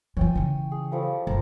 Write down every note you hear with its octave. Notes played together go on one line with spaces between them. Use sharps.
E3 F3 C#5 G5 G#5
C#3 E3
G#4
F3 G3 A3
G1 A#4 C5